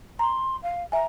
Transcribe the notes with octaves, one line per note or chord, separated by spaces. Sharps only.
A#5 C6
F5
E5 G#5 A#5